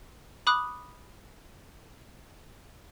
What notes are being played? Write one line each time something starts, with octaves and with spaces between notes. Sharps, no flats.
B5 D6 D#6 F#6